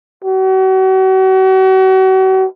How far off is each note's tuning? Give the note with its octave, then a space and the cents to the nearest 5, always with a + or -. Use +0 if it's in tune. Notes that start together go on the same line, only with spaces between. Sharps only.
F#4 +40